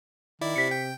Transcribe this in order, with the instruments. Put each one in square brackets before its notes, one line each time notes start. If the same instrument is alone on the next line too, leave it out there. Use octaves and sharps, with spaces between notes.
[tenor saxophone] D#3 [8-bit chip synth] E4 D5
[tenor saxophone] C3 [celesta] B6 C#7
[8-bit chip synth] G5